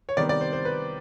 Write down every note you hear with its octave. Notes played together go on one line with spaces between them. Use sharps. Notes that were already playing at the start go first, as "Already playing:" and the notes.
C#5
C3 D#3 G3 B3 D5
D5
C5
C5
B4